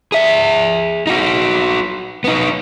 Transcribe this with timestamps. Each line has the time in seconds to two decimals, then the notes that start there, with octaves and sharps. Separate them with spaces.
0.12 G#4 E5
1.07 D#4 F#4
2.24 B3 D#4